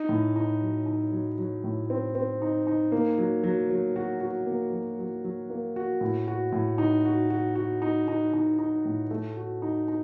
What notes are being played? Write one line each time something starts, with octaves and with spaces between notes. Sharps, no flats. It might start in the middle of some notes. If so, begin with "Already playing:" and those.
Already playing: D#4
A2
D#4
F#3
D#4
F#3
F#3
A2
C4
C4
D#4
D#4
A#3
F#3
F#3
F#3
F#4
F#4
A#3
F#3
F#3
F#3
A#3
F#4
A2
F#4
A2
D#4
F#4
F#4
F#4
D#4
D#4
D#4
D#4
A2
A3
F#4
D#4
D#4